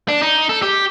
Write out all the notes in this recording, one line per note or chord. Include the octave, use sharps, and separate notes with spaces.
D4
D#4
A4
G4